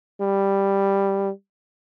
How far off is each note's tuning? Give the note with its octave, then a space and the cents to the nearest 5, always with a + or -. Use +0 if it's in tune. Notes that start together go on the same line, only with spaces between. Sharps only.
G3 +5